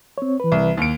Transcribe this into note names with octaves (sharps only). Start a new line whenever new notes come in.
C4 C#5
E3 B4
C2
D#2 D7